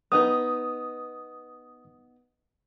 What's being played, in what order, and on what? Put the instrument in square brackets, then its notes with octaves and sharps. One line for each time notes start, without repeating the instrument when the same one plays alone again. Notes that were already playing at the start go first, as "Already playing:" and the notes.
[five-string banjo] B3 D#4 B4 [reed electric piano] D#6